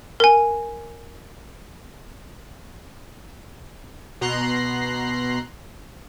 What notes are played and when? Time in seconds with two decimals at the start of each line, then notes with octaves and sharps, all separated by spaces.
0.20 A#4 G#5
4.21 B2 A#5 C6 F#6 C7